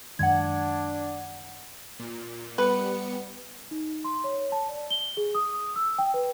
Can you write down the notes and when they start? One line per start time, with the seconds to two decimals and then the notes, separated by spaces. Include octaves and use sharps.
0.19 F#2 D#3 G#3 D4 F#5 G#6
2.00 A#2
2.58 G3 B3 B4 C#7
3.71 D#4
4.04 C6
4.24 C#5
4.52 A5
4.69 D5
4.91 G7
5.17 G#4
5.35 D#6
5.76 E6
5.98 G5
6.14 B4